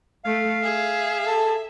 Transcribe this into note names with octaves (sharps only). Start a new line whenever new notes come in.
A3 F5
G#4 E5
A4